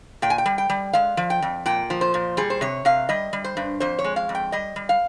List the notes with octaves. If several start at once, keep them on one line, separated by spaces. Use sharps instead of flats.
A#2 G5
G#5
G5
G3
G5
G3
G#3 F5
F3
G5
F2
A#2 G5
F3
C5
A#2
G3 G#4
C5
C3 C#5
C3 F5
G3 D#5
G3
C5
G2
F2 C5
C#5
G#3
F5
F2
G5
G3 D#5
G3
F5